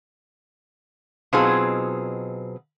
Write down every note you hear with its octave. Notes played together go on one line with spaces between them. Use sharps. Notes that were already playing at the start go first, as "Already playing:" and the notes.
B2 F#3 C4 D#4 F4 G#4